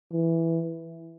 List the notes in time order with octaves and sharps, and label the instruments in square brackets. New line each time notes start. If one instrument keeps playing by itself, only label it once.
[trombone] E3